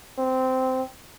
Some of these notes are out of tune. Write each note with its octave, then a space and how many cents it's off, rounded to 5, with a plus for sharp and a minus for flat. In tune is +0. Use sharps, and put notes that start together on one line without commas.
C4 -15